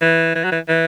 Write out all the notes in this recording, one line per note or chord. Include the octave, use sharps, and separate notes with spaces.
E3
E3
F#3
E3
E3